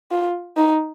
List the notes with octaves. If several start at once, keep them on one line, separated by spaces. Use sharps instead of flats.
F4
D#4